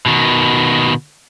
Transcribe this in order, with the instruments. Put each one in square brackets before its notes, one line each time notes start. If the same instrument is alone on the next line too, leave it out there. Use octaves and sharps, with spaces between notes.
[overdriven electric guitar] B2 D#3